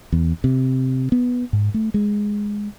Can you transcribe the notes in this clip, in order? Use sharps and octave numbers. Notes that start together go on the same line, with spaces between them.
E2
C3
B3
G#2
A3
G#3